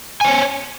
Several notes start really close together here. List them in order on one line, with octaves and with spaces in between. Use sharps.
G#5 C5 C#5